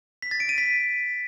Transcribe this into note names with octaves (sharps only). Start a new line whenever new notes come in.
B6
A6
D7
D#7
B6